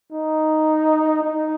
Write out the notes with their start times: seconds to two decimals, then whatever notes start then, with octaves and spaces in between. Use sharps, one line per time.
0.12 D#4
1.23 D#4